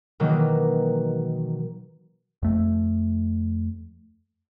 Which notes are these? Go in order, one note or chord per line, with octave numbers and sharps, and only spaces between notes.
B2 D#3 E3 F#3 A#3
F2 A3